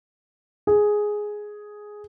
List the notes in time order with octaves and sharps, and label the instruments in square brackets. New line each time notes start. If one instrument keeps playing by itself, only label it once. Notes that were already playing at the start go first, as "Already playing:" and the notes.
[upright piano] G#4